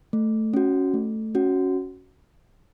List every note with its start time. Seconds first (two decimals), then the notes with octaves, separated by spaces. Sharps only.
0.13 A3
0.54 C#4 F#4
0.94 A3
1.35 C#4 F#4